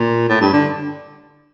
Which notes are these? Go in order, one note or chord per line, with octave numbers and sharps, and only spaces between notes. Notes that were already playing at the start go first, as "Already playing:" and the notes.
Already playing: A#2
A2
G2
D3